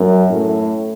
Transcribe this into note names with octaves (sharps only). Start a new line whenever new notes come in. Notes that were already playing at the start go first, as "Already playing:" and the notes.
Already playing: F#2
A2